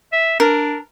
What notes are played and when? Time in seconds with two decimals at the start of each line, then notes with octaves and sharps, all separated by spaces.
0.12 E5
0.40 D4 A#4